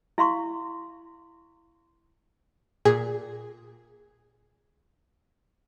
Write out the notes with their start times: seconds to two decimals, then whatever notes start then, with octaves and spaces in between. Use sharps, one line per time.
0.18 E4 F5 C6 C#6
2.85 A#2 G#4